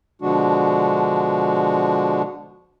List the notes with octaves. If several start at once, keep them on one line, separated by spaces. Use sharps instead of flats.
B2 D3 F3 G#3 D4 F#4